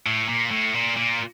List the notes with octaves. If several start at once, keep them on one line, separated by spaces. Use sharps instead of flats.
A2
A#2
A2
A#2
A#2